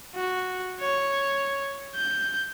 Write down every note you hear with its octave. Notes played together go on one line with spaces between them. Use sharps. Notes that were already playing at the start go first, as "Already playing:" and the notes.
F#4
C#5
G6